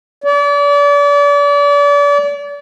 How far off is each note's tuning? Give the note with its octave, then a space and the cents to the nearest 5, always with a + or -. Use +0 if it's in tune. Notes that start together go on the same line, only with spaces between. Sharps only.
D5 -35